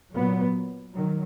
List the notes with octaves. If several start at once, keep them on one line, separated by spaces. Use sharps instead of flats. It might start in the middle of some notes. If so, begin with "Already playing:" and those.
A#2 F#3 B3
D#3 F#3